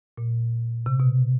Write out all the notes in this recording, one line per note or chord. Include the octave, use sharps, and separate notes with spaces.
A#2
C3
B2